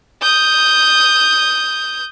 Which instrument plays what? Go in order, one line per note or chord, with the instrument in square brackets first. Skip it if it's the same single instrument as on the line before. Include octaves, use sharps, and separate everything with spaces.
[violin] D#6 G6